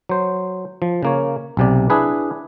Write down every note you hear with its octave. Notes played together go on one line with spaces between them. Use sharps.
F#3 C5
F3
C#3 A#3 C#5
B1 C3 D5
D4 E4 G#4 B4